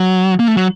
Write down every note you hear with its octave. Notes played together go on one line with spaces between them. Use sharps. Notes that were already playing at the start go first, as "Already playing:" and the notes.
Already playing: F#3
A#3
A3
F#3